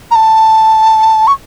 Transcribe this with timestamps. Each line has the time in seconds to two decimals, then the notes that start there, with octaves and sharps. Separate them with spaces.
0.11 A#5
0.15 A5
1.27 C#6